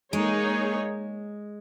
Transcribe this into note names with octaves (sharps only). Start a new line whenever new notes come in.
G#3 A#3 D#4 G#4 C#5